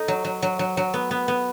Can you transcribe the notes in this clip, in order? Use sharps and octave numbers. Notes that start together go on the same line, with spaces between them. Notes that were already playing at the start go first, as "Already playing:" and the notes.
Already playing: D#4 A4
F#3
F#3
F#3
F#3
F#3
B3
B3
B3